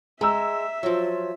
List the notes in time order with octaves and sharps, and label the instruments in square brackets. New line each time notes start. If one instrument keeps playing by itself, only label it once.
[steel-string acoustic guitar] G#3 [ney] D#5 [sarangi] E5 [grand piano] A#5 E6
[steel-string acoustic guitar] F3 F#3 [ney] F4